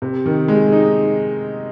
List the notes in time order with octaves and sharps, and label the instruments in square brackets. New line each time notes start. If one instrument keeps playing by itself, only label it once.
[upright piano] C3
D#3
G#3
D#4